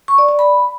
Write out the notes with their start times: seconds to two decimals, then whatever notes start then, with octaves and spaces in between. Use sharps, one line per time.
0.08 C#6
0.18 D5
0.29 D5
0.39 B5